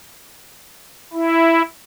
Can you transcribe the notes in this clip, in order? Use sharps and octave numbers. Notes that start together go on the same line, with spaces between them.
E4